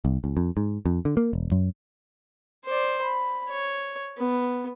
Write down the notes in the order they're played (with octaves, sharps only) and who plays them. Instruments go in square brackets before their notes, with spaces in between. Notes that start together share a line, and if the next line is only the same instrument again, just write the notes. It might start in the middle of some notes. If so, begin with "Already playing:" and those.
[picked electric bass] C2
C#2
F2
G#2
F2
D3
A#3
E1
F#2
[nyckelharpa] C5 D5
B5
C#5
B3